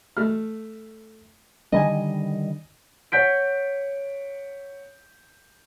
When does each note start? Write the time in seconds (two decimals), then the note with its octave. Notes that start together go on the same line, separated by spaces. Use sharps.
0.17 A3 F6
1.72 D3 D#3 G3 D#5 G#5
3.12 C#5 F#5 G6 B6 D7